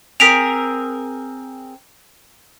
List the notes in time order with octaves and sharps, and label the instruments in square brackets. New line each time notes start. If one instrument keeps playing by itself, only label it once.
[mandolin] C4 G#4 A#4 [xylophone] B6 D7 F7